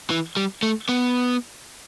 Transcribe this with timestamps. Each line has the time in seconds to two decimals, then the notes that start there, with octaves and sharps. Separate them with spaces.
0.10 E3
0.37 G3
0.63 A3
0.89 B3